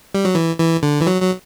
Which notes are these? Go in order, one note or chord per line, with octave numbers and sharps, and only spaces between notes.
G3
F#3
E3
E3
D3
E3
F#3
F#3